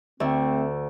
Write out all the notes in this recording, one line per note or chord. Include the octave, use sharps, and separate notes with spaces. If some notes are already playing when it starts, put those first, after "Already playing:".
D2 A3 C4 E5